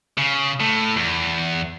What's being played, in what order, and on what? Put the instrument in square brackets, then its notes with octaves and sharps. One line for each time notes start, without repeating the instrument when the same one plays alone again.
[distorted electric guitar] C#3
A2
E2